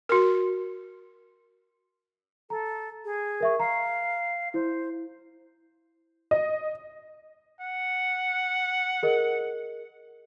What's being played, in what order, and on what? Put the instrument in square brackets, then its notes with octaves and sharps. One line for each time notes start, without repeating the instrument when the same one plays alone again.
[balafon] F#4 A#4
[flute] A4 [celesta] A#5
[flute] G#4
[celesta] A#4 E5 C#6
[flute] F5 [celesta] A#5
[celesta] E4 [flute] C5
[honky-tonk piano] D#5
[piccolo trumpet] F#5
[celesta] G#4 A#4 D#5